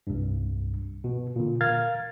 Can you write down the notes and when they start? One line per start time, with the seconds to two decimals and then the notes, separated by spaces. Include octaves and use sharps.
0.07 C2 G2
1.04 B2
1.36 A#2 D3
1.61 A#4 F5 F6 G#6 A6